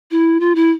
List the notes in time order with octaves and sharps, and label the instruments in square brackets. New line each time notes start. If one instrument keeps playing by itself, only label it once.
[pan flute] E4
F4
E4